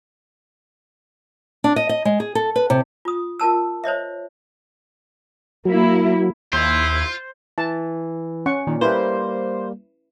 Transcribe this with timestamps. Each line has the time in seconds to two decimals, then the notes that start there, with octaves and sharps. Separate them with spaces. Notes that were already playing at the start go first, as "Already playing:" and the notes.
1.64 D4
1.76 D#5
1.89 D#5
2.05 G#3
2.20 G#4
2.35 A4
2.56 B4
2.70 C3
3.05 F4 D#6
3.39 F4 A#4 A5 E6
3.84 C5 C#5 D#5 E5
5.65 F#3 A#3 E4
6.53 D#2 E4 F4 C5
7.58 E3 A5
8.46 C#4 F#5 C#6
8.67 A#2 D#3
8.81 G3 A#3 E4 B4 C5